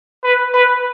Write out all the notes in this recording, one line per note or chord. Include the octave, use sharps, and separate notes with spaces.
B4
B4